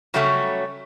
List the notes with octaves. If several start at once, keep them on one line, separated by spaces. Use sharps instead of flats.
C#3 F#3 G3 A3 B3 C#4